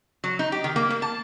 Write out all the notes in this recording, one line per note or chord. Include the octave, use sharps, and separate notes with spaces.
F#3
D#4
G4
D#3
A#3
A#3
A5